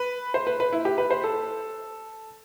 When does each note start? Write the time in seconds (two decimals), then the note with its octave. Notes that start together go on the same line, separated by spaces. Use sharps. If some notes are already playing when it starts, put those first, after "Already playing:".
Already playing: B4
0.34 C5
0.47 B4
0.60 B4
0.73 E4
0.85 G4
0.98 B4
1.11 C5
1.24 A4